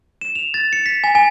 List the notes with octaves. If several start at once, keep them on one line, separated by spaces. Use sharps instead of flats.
E7
F7
A6
C#7
B6
G#5
G#5